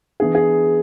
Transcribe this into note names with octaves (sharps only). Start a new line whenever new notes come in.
E3 B3 D4 G#4
G#4